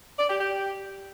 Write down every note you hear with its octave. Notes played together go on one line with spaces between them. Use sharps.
D5
G4
G4